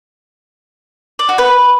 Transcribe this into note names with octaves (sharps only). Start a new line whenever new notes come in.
D5
F#4
B4